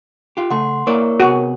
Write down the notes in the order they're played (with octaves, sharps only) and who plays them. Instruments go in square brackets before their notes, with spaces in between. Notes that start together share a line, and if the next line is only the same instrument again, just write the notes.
[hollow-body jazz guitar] F4 G4
[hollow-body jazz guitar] C#3 A3 [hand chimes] F#5 C6
[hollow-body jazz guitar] A#3 E4 D5 [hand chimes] A#4 C#5 C#6
[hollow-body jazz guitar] C3 B3 G#4 [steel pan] F#4